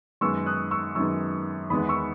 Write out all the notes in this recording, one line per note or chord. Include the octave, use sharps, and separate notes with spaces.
F#2 D#3 G#3 B3 C#6 E6
D#6 F#6
C#6 E6
F#2 D#3 G#3 B3 C#6 E6
E2 D#3 G#3 B3 B5 D#6
C#6 E6